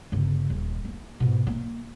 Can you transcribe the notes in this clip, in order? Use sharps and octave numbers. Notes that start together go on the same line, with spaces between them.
G1 C#3
D#1
A#3
G#2 B2
A#3